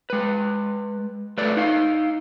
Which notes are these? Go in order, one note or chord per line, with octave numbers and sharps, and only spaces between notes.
G#3 B4
A3 B4 D5
D#4 F5